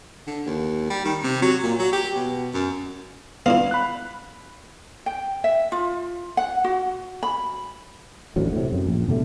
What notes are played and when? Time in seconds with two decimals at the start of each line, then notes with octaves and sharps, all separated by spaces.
0.27 D3
0.46 D#2
0.90 G3
1.05 D#3
1.23 C3
1.42 F#3
1.63 A#2
1.79 F#3
1.93 G4
2.16 B2
2.53 F#2
3.46 B3 D4 E4 F5
3.71 B5 F#6
5.06 G5
5.44 E5
5.72 F4
6.37 F#5
6.64 F#4
7.23 B5
8.36 A1 D2 F#3
8.52 A2 C3
8.72 F#2
8.87 A#1
9.08 B2 D3 G3 A3